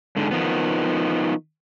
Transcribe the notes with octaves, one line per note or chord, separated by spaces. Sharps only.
G#2 D3
D#3 F3 B3